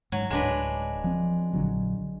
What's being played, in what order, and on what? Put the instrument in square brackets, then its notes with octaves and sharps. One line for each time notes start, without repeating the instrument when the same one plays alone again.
[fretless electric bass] G#2 [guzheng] F#3
[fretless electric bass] D1 [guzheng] G#3 D4 B4
[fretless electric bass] F3 C4
A#1 D3 F#3